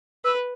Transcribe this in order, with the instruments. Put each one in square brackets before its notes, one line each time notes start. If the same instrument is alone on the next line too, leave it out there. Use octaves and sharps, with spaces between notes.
[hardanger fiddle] B4 [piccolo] E6